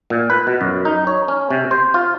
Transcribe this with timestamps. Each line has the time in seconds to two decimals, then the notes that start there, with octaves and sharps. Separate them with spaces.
0.10 A#2
0.30 B4
0.47 B2
0.61 F#2
0.85 D#4
1.07 C#5
1.28 C#4
1.51 C3
1.71 C5
1.94 F4